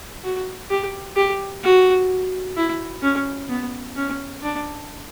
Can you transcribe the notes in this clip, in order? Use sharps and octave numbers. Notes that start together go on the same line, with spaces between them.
F#4
G4
G4
F#4
E4
C#4
B3
C#4
D4